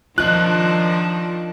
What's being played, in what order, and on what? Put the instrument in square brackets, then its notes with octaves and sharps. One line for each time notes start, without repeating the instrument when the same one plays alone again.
[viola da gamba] D#3 F3 D4 [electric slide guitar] F4 D#5 [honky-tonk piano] F#6